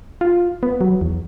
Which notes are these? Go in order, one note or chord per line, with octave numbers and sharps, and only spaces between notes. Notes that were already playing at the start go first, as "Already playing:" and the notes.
F4
B3
F#3
E2